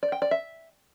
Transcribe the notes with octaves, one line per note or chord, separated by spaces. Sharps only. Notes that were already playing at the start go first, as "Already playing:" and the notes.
D5
G5
D5
E5